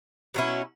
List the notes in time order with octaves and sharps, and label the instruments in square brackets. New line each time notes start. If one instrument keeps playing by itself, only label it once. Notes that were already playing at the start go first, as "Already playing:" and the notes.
[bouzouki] B2 F#3 C#4 E4